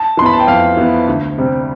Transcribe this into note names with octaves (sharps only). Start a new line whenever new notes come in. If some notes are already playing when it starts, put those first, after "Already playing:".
Already playing: A5
E3 B3 B5 C6
A5
G5
F2 F5
E3 B3
D2
C3 G3 C4